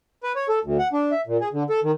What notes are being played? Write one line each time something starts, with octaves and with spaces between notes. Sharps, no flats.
B4
C#5
A4
D2
F#5
D4
E5
A#2
G#4
D3
A4
D#3